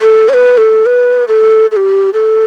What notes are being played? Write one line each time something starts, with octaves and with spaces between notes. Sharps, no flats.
A4
C#5
B4
A4
B4
A4
A4
G4
A4